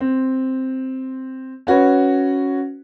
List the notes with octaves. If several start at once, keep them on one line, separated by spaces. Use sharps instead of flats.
C4
C#4 F#4 B4 C#5